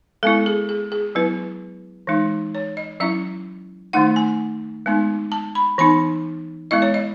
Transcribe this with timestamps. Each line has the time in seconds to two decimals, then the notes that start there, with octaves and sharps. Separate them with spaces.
0.23 G#3 B3 E4 A4
0.46 G#4
0.69 G#4
0.92 G#4
1.15 F#3 B3 E4 B4
2.07 E3 G#3 D#4
2.55 C#5
2.77 D#5
3.00 F#3 C#4 E4 E5
3.93 D#3 A3 D#4 F#5
4.16 G#5
4.86 G#3 B3 D#4
5.32 A5
5.55 B5
5.78 E3 B3 D#4 B5
6.71 G#3 B3 E4 D#5
6.82 C#5
6.94 D#5